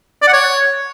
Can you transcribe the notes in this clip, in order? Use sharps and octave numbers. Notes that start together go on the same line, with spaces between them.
D5
F#5
C#5